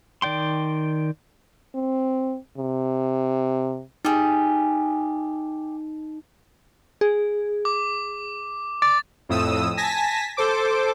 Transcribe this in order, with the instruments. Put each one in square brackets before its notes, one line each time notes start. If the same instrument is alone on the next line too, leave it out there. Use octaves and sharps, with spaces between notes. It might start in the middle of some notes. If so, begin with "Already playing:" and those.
[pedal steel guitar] D#3 D5 G5 C6
[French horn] C4
C3
[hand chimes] D#4 [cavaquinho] G4 G#4
[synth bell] G#4
[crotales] D6
[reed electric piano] D6 [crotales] A6
[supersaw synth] F2 A2 D#6 E6
G#5 A5 A#6 B6
A4 C5 D6